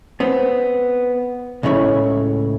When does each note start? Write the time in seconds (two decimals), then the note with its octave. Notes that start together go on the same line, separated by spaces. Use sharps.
0.20 B3 C4
1.63 C#2 A2 C#3 E4 C#5